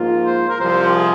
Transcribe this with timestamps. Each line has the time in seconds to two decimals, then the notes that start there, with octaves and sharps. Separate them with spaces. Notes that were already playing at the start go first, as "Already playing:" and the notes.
Already playing: G#2 F3 A#3 F4
0.25 C5
0.50 A#4
0.60 C2 C3 F3 C5
0.88 G4
0.95 G#4